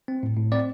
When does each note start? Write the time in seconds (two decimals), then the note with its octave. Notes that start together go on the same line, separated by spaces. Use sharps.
0.08 C4
0.23 A2
0.37 A2
0.52 C4 D5